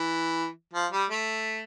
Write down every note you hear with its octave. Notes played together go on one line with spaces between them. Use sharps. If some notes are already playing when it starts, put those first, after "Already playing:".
Already playing: E3
F3
G3
A3